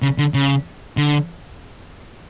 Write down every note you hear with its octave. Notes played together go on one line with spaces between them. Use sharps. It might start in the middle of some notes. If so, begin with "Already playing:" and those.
C#3
D3
C#3
D3